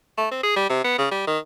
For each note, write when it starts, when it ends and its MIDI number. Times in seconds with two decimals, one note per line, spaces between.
0.18 0.27 57
0.31 0.41 60
0.43 0.52 68
0.56 0.67 55
0.70 0.81 48
0.84 0.96 59
0.98 1.06 49
1.11 1.25 55
1.27 1.38 51